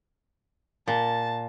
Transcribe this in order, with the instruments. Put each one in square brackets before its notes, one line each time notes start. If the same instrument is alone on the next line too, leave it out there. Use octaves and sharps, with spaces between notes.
[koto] A#2 [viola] A5